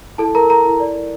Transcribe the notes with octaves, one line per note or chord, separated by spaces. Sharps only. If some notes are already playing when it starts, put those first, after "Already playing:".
E4 A4 A5
A4 A#4 A#5
A4 A#4 A#5
E4
D5
A#4